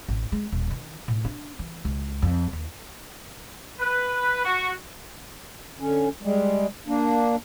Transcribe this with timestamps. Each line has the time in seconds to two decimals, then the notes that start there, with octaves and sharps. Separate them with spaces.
0.08 A1
0.32 G#3
0.52 D#1
0.71 D#3
1.08 A2
1.25 D4
1.59 E3
1.85 C#2
2.22 F2
2.53 D#2
3.80 B4
4.45 F#4
5.80 D3 C#4
6.23 G3 G#3
6.87 A#3 D4